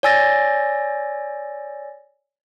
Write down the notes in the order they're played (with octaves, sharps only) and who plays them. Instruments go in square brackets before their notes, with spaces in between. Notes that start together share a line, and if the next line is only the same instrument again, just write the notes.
[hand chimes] C#5 D5 G#5 E6 A6 A#6